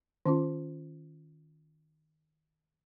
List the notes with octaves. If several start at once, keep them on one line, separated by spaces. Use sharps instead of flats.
D#3 C#4 F4